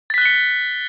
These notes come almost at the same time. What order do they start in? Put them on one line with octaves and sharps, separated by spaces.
A6 B6 F#6 G7 C#7